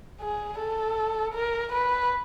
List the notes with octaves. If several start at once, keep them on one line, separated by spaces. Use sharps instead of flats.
G#4
A4
A#4
B4